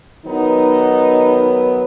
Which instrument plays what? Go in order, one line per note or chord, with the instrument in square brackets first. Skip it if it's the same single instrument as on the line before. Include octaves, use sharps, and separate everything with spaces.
[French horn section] D#3 F#3 B3 D#4